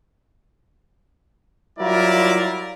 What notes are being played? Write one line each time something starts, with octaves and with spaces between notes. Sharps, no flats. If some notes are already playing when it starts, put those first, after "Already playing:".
F#3 G3 E4 F4 A#4 D5